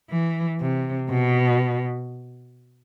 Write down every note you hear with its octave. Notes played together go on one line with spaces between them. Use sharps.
E3
C3
B2